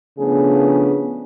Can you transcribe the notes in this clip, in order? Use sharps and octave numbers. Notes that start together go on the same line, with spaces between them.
C#3 F3 A3 B3 D4 G#4